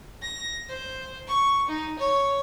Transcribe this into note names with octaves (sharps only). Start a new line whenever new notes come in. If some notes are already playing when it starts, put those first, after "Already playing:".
A#6
C5
C#6
D#4
C#5